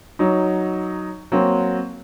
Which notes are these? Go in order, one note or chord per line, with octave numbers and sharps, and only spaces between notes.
F#3 D#4
F#3 A#3 C4